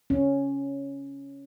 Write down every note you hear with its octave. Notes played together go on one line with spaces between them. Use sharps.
C#4